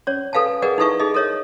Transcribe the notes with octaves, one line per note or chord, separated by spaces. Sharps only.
C#4 C#5 D5
A4 B4 F5 G#5 A5
G#4 A#4 B4 D5 D#5 F#5
D#4 E4 A4 B4 E5 C#6
D#4 G#4 A4 D#5
A4 A#4 C#5 D#5 E5